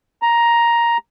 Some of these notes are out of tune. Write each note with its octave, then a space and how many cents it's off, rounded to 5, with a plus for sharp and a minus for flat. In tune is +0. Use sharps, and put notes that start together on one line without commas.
A#5 +10